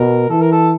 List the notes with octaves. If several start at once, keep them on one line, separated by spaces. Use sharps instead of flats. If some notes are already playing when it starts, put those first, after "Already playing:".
Already playing: B2 A#4
E3 A4
A#4
A4